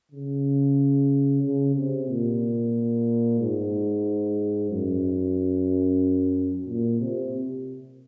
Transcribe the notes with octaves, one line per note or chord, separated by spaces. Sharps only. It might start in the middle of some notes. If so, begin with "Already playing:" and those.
C#3
C#3
C3
A#2
G#2
F#2
A#2
C3